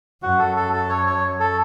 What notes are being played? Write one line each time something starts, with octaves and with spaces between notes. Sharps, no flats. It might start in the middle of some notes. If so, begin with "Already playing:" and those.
F#2 F#4
A4
A4
A4
C#5
C#5
A4